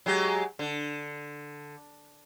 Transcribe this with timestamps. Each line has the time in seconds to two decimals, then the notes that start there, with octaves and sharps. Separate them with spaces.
0.06 F#3 G#3 G4
0.59 D3